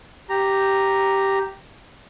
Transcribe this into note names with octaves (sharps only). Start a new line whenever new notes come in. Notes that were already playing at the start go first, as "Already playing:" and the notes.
G4 A#5